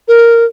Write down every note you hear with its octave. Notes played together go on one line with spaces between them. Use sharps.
A#4